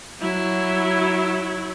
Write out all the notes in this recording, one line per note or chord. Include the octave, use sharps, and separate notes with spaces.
F#3 E4